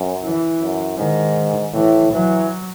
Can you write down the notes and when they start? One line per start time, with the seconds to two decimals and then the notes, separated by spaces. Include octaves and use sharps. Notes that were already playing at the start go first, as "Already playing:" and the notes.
Already playing: F#2
0.23 E3
0.60 F#2
0.98 G#2 D#3
1.74 A2 E3
2.12 E3 F#3